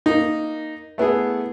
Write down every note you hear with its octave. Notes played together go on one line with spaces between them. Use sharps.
A#3 D#4
A3 B3 E4 G#4